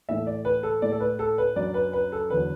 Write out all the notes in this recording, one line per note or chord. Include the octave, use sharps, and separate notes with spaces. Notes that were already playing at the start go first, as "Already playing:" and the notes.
A2 E3 A3 E5
D5
B4
A4
A2 A3 E4 D5
A4
B4
A4
B4
F#2 F#3 D4 D5
B4
B4
A4
E2 D3 F#3 B4